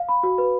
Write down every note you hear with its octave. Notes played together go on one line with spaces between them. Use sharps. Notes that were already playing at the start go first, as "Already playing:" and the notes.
Already playing: F5
B5
F#4
B4